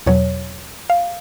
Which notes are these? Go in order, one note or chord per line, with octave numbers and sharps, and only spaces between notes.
E2 B2 F#3 C#5
F5